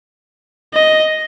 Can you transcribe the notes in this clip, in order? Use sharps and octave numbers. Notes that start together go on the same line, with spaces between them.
D#5